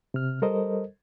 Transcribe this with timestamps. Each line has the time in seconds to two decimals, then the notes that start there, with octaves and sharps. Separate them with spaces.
0.14 C3 F6
0.42 G3 A4 A#4 C5 D#5